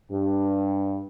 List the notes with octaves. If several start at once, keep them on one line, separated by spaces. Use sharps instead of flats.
G2